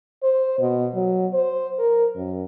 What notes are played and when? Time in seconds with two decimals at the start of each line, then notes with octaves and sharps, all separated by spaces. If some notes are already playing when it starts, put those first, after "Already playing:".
0.23 C5
0.59 B2
0.94 F#3
1.33 C5
1.79 A#4
2.16 F#2